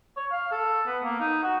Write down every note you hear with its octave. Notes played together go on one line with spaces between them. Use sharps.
C#5
F5
A4
B3
A#3
D#4
F#4